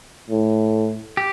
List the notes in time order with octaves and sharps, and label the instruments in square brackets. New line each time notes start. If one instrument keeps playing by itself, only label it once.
[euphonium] A2
[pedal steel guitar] G4